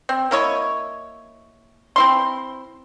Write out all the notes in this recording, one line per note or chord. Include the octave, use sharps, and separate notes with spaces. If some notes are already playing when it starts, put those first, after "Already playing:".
C4
A#3 E4 C#5 D#5
C4 E4 C6